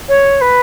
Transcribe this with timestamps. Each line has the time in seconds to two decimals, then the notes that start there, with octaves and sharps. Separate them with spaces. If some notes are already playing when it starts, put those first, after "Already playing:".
0.09 C#5
0.41 B4